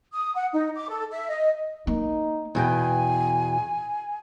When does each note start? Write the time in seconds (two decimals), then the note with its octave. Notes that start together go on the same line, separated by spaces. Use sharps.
0.13 D#6
0.35 F#5
0.52 D#4
0.76 D6
0.89 A4
1.12 E5
1.29 D#5
1.87 A#3 D#4
2.55 E2 B2 G5 G#5